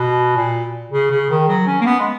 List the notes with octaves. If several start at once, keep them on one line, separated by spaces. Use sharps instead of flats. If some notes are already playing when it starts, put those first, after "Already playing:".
Already playing: B2
A#2
C#3
C#3
D#3
F#3
C#4
A#3
B3
G#3